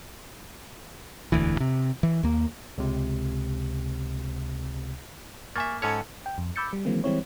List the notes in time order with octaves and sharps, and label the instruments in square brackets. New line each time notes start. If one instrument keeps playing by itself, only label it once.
[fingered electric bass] E1 D2 E3
C3
E3
D#2 A#3
[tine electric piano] C#2 C3
[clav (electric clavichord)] A#3 E5 [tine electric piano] G#5 C#6 A6
[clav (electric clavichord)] G#2 C#4 C#5 [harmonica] A4 [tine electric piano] G#6
[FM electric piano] G5
F2
B5 D6 E6 G6 A6 C#7
G3
D#3 E3 F#3 G#3 A#3 C4
E3 G3 G#3 C4 E4 C#5